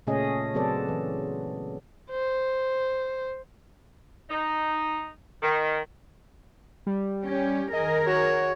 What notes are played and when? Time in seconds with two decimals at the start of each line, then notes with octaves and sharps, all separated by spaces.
0.07 A#2 C#3 A3 C#4 G#4 D#5
0.54 C#3 F#3 B3 C4 A4 D5
0.89 E3
2.11 C5
4.30 D#4
5.42 D#3
6.87 G3
7.24 C#4 G4
7.73 D#3 G#4 A#4 D#5
8.07 F#4 C#5